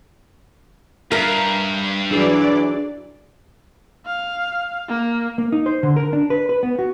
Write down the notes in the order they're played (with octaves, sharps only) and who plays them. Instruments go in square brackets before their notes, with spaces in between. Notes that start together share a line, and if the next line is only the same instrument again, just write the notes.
[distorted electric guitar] G2 [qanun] A#4 A#5 [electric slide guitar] E5 F5
[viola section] E3 F#3 D5 [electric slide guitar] D4 G#4 A4
[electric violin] F5
A#3
[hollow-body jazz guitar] A#3
D#4
C5
D3
A#4
D4
B4
B4
B3
F#4